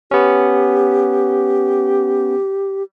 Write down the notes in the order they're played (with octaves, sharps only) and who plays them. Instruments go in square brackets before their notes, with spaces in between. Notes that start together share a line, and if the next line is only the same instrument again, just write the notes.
[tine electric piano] B3 C#4 [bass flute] G4